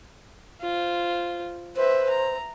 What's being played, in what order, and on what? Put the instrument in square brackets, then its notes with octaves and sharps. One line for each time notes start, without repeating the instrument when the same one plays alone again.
[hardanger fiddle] F4 C5
[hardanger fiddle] B4 E5 [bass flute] C5
[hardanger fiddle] A#5